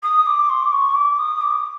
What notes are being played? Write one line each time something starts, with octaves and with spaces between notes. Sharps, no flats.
D#6
D6
C6
D6
C#6
D6
D#6
D6